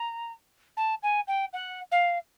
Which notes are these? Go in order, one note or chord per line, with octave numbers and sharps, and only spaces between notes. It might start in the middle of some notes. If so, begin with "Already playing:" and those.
Already playing: A#5
A5
G#5
G5
F#5
F5